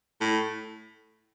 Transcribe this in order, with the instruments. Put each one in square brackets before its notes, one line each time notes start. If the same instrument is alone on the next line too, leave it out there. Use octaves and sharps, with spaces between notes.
[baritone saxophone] A2